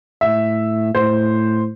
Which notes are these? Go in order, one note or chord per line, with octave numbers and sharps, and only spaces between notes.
A2 E5
A2 C5